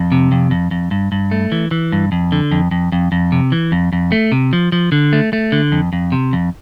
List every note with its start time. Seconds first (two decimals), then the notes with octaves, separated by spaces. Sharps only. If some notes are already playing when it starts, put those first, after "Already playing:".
Already playing: F2
0.12 C3
0.32 F2
0.51 F2
0.71 F2
0.91 G2
1.12 G2
1.31 A3
1.52 E3
1.71 E3
1.92 G2
2.12 F2
2.32 D3
2.52 F2
2.71 F2
2.92 F2
3.12 F2
3.32 C3
3.52 E3
3.72 F2
3.93 F2
4.12 A3
4.32 C3
4.53 F3
4.72 F3
4.92 D3
5.13 A3
5.33 A3
5.52 D3
5.72 F2
5.93 F2
6.12 C3
6.33 F2